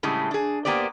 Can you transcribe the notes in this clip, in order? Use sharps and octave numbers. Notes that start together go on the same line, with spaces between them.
A2 C#3 G3 G#3
D4 G#4
A#3 B3 G4 C5 D5